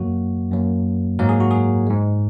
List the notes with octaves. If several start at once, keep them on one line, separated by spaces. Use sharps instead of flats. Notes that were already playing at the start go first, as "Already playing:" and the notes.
Already playing: F#2 F#3 A#3 F#4
F#2 F#3 A#3
G#2 F#3 A#3 A#4
G#4
F#4
G#4
G#2 G#3